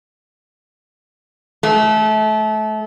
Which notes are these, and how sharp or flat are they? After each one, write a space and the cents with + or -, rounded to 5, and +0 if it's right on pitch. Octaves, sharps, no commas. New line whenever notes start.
A3 -30